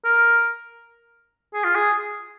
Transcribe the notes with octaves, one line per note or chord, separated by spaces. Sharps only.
A#4
G#4
F4
G#4